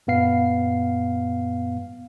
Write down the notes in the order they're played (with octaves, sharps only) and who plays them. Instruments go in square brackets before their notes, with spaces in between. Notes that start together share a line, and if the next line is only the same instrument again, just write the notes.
[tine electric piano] F#2 A#2 B3 F5 C7